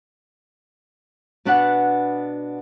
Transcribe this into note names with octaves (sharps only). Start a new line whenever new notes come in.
B2 B3 D4 B4 D5 F#5